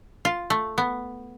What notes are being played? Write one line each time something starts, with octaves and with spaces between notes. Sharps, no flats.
F4
A3
B3